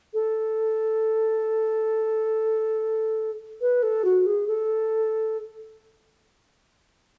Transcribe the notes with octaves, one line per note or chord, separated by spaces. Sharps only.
A4
B4
A4
F#4
G#4
A4